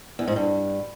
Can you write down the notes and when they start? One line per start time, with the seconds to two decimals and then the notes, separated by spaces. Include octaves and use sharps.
0.19 E2
0.28 G#2
0.36 G2